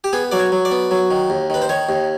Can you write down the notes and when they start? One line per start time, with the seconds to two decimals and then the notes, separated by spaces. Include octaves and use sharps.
0.04 G4
0.13 B3 G#4
0.32 F#3 D5
0.39 C#5
0.52 F#3
0.65 D5
0.71 B3
0.91 F#3
1.11 D#3
1.30 D#2
1.50 D#3 B4
1.62 C5
1.69 D#3 C#5
1.89 D#2